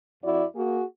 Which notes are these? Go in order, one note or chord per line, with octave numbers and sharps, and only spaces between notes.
F2 E4 F#4 D5
A#3 F#4 G#4